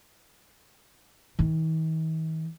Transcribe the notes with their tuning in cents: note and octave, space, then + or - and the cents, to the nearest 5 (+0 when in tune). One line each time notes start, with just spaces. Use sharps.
D#3 +45